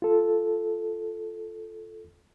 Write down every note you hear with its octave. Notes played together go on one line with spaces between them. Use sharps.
F4 A4